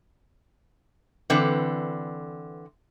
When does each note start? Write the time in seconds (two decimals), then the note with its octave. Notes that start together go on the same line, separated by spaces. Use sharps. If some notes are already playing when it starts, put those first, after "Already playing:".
1.30 D3 E3 C4 A4 B4